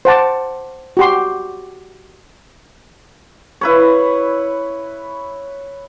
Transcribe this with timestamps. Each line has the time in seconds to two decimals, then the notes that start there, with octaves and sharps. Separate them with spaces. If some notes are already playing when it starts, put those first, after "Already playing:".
0.05 C5 F#5 A5 D6
0.97 F#4 G4 C6
3.61 E4 B4 C#5